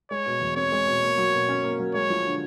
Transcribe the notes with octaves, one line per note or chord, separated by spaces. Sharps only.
G#3 C#5
B2
E2
C4 C#5
G#3
B2
A#3
F#3
B2
C#4
A#3
F#3
G#3 C#5
F3
D3